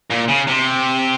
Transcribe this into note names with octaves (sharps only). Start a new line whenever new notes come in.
A#2
C#3
C3